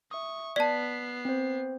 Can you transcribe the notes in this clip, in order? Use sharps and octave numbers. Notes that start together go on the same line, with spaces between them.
E5 C#6 D#6
B3 D5 A5 B6 C7
C4 C5